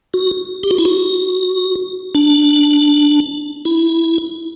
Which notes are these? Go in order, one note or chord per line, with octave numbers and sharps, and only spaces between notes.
F#4
G4
F#4
E4
F#4
D4
E4